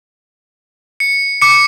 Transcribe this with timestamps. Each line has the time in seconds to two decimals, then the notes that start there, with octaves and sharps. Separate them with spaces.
1.00 C#7
1.42 D6 C#7